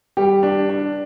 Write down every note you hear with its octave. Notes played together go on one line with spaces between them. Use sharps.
G3 G4
D4
D4